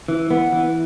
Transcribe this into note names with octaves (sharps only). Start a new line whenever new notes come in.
E3
E3 B3
E3